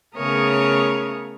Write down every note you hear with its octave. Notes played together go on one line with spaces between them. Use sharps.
C#3 A3 B3 A#4 C#5 D#6